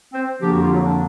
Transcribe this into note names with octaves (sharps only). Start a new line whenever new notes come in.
C4 C5
F2 D3 F3 A#3 D4 G4
F#4
F4
F#3 F#4
D4